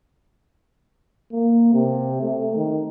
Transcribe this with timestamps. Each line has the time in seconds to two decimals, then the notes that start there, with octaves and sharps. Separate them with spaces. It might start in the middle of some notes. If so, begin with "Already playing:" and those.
1.32 A#3
1.73 C3
2.21 A3
2.56 D#3